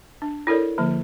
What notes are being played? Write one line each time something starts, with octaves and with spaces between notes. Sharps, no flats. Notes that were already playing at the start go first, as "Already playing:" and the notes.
D4
E4 A4 A#4 C#5 D5
D3 F3 A#3